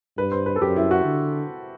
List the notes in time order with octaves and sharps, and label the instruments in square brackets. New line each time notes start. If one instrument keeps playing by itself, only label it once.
[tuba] G2 [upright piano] B4
[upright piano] C5
B4
A4
[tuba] F#2 [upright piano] G4
[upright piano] E4
F#4
[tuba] D3